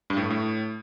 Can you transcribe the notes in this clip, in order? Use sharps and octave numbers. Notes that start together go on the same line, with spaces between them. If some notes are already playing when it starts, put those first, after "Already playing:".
G2
A2
G2
A2